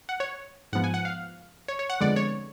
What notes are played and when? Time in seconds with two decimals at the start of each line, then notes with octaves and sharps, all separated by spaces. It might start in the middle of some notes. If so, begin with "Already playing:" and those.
0.09 F#5
0.20 C#5
0.73 G#2 F3 B3 F#5
0.84 G#5
0.94 F#5
1.05 F5
1.68 C#5
1.79 C#5
1.90 F#5
2.01 F2 D3 G#3 B3 D5
2.16 C#5